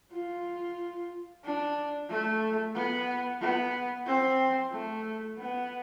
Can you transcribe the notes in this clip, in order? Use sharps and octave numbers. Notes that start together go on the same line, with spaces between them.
F4
D4
A3
B3
B3
C4
A3
B3